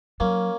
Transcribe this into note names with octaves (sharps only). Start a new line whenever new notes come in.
F#3 A#3 C#4